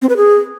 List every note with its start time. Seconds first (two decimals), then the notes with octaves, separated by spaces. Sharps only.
0.02 C4
0.09 B4
0.17 G#4